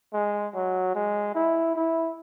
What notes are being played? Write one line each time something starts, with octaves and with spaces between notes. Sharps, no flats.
G#3
F#3
G#3
E4
E4